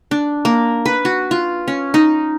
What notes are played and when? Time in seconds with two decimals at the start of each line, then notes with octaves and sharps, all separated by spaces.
0.11 D4
0.45 A#3
0.86 B4
1.05 F#4
1.31 F4
1.68 C#4
1.94 D#4